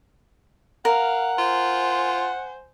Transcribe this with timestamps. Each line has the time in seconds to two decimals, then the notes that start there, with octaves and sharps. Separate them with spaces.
0.85 A#4 F5 F#5
1.38 F4 C5 G#5